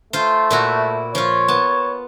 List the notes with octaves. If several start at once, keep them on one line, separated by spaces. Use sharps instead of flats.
A3 F4 C5
A#2 E4 F#4
F3 F4 C#5
B3 A5